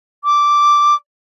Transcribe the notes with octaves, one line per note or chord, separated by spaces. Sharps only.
D6